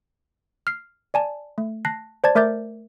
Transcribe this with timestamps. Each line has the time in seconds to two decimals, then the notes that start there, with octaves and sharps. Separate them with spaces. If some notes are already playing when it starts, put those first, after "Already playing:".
0.67 F6 C7
1.14 D5 G#5 A5
1.58 A3
1.85 A5 F#6 A#6 C7
2.24 C5 D5 A5 G#6 A6
2.35 A3 A#4 E5 D6 G6 A6